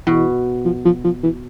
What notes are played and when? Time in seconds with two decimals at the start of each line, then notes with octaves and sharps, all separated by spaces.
0.07 B2 E3
0.65 F3
0.85 F3
1.04 F3
1.23 E3